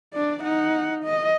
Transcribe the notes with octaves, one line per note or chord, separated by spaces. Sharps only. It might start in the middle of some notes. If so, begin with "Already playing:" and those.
D4 D5
D#4 F#5
D#5